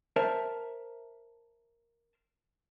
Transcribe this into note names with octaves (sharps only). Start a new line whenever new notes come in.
A#4 C5 E5 A5